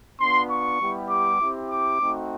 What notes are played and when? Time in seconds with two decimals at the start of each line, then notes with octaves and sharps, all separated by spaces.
0.20 B3 D4 F4 C6
0.50 C#6
0.80 G3 B3 E4 G4
1.09 D6
1.40 C4 E4 G4
1.69 D6
1.99 A3 C4 D#4 F#4